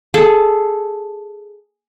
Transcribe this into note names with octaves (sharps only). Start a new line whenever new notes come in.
G#4 A4 A5